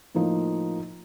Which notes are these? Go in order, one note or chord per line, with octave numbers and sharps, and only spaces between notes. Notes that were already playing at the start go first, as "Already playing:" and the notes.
A2 F3 A#3 D#4